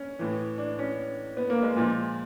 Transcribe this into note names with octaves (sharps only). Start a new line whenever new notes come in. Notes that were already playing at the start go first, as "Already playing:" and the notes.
Already playing: C#4
A2 E3
D4
C#4
B3
A#3
G#3
A#2 F3